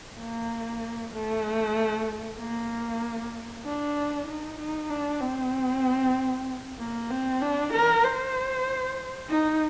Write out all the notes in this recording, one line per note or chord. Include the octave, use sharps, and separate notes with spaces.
A#3
A3
A#3
D4
D#4
D#4
D4
C4
A#3
C4
D4
A#4
C5
D#4